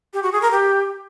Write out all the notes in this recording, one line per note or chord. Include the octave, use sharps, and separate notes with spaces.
G4
F#4
G#4
A#4
G4